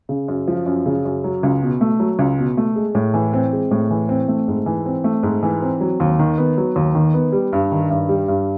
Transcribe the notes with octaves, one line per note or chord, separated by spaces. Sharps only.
C#3
F#2
F3
F#2
C#3
F#2
F#3
C#2
B2
A3
F#3
C#2
B2
A3
G#3
A2
E3
C4
G#3
A2
E3
C4
A3
G#2
E3
C4
A3
G#2
E3
C4
F#3
D#2
D#3
B3
F#3
D#2
D#3
B3
G3
G2
D#3
G2
G3
G2